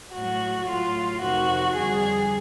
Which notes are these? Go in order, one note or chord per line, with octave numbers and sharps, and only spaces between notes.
A2 F#3 A3 F#4
A2 F#3 A3 F4
F2 C3 D#3 F#4
F2 D3 G3 G#4